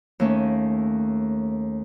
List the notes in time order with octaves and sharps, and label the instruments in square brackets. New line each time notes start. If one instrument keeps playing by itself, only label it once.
[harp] D#2 A3 C#4